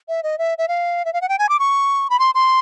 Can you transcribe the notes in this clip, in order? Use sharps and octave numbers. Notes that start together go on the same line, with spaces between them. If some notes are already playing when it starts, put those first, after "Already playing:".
E5
D#5
E5
E5
F5
E5
F5
F#5
G5
G#5
D6
C#6
B5
C6
C6